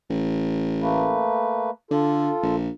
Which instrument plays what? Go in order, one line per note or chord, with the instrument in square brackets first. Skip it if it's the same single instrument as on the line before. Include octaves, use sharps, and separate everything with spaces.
[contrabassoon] A1
[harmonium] A3 A#3 B4
[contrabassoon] D3 [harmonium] F4 A4
[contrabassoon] A#1